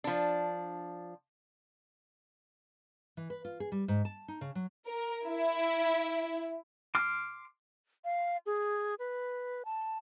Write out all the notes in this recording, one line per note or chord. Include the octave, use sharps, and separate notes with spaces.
F3 D4
E3
B4
F4
G#4
G3
G#2
A5
D#4
C#3
F#3
A#4
E4
C6 D6 F6
F5
G#4
B4
A5